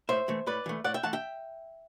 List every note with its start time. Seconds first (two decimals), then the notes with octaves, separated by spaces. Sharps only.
0.09 A2 C5 E5
0.28 E3 A3
0.47 A2 B4 D5
0.66 E3 A3
0.84 A2 D5 F#5
0.94 E5 G5
1.03 E3 A3 F#5 A5
1.13 E5 G5